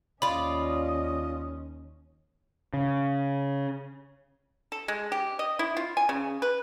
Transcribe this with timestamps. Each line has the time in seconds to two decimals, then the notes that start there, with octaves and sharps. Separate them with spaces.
0.22 D#2 C#4 F4 D5 D#5 B5
2.73 C#3
4.72 A4
4.88 G#3
5.12 G4
5.39 D#5
5.59 E4
5.77 F4
5.97 G#5
6.09 C#3
6.42 B4